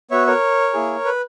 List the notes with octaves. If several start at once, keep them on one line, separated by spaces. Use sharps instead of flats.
B3 F#4 C#5 E5
A#4 C#5
A#3 E4 G#4
B4